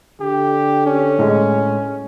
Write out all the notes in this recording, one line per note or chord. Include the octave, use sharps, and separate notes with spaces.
D3 G4
C#4
A2 G#3